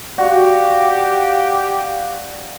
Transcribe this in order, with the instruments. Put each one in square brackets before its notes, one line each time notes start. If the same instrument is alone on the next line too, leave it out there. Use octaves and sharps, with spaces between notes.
[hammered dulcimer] F#4 [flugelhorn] G4 [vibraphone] D5 F5